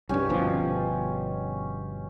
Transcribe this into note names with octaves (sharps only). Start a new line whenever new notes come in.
C2 G2 C#4 G4
G1 B2 F3